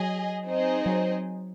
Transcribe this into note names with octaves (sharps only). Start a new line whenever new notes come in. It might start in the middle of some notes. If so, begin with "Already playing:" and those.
Already playing: F#3 G#4 D#5 G#5
C4 D#4 G#4 C5 D#5
F#3